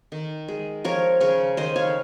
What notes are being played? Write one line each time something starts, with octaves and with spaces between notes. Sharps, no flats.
D#3
G#3
F3 A#4 C#5
C#3 A#4 C#5
D#3 C5 D#5
C#5 F5